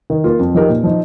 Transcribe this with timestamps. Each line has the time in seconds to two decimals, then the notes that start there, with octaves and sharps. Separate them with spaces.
0.10 D#3
0.24 A#3 F4
0.39 F2
0.54 F3 D#4 G4 A#4
0.69 A#2
0.84 F3 D#4